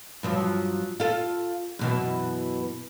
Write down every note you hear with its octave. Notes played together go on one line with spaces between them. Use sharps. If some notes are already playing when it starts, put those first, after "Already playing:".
G2 F3 F#3
F4 A4
F#2 B2 E3